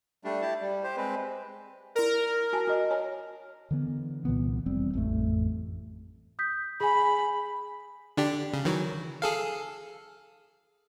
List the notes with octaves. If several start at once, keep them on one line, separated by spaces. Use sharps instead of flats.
G3 A3 D4
E4 G4 A5
G3
G4 C5
G#3 C4 B4
E4 A#4 D5
F#4 G#5 A5
F#4 D#5
C#5 G#5 A#5
D3 E3 B3
C2 A#2 E3 B3
F1 G3 C4
A1 F2 A3
D#6 G6 B6
G#4 G#5 B5
D3 D4 G4
C#3
D#3 E3 F#3
G#4 A4 F5